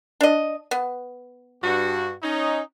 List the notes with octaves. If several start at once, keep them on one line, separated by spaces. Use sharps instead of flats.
D4 D#5
B3
G2 F#4
C#4 D#4